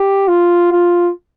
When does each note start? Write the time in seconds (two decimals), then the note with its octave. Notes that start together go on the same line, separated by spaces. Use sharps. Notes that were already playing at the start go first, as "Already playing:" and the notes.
Already playing: G4
0.28 F4
0.72 F4